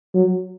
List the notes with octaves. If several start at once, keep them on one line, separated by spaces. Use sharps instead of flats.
F#3